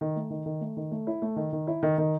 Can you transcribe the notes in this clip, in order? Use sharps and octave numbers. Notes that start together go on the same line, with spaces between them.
D#3
A3
D#3
D#3
A3
D#3
A3
E4
A3
D#3
D#3
E4
D#3
D#3